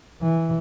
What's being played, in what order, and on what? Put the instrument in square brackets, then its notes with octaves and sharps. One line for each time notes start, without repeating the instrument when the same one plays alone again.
[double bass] E3